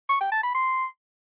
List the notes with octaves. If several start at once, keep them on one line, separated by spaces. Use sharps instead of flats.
C#6
G5
A5
B5
C6